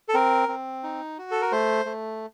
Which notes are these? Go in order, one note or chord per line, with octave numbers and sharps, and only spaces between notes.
A4
C4 A#4
C4
D#4
F#4
A4
A#4
A3 C5
A3